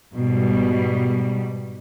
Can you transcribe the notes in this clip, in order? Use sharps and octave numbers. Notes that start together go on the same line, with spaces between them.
G#2 B2 G3